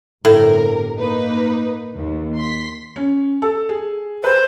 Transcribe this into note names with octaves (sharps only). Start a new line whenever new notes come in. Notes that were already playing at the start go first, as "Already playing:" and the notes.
G1 A2 C3 A#4
A#3 D#4 B4
D#2
C6 B6
C#4
A4
G#4
B4 C5